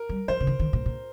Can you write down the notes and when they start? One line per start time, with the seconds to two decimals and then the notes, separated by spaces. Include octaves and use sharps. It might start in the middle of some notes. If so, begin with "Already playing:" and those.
Already playing: A#4
0.09 G3
0.28 F3 C5
0.40 C#3
0.47 D#3
0.59 D#3
0.73 A#2
0.86 A#2